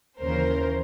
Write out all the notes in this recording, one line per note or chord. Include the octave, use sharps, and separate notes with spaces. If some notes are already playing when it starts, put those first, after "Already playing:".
D#2 C#3 E3 A#4 C5